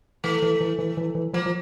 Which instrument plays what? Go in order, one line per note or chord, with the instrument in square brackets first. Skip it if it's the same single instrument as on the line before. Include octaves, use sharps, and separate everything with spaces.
[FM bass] E3 [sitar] A3
[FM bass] E3
E3
E3
E3
E3
[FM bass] F3 [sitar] A#3
[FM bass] F3